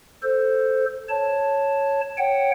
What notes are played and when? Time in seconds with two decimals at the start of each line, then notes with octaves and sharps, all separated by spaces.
0.23 A4 C5
1.09 C#5 A5
2.18 C#5 F#5 G5